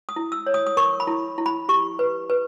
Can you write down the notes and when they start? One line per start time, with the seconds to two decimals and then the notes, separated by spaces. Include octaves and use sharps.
0.09 D#6
0.16 E4
0.32 E6
0.46 C#5
0.54 D#6
0.67 D#6
0.77 A#4 C#6
1.00 B5
1.07 E4
1.38 E4
1.46 B5
1.69 G4 C#6
1.99 B4
2.30 B4